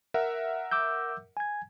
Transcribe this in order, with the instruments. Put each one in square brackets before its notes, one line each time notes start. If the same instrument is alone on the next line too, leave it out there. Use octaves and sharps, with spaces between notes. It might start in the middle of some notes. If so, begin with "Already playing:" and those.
[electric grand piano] A#4 E5 F#5
[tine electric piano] D6 E6 G6
G#5 G#6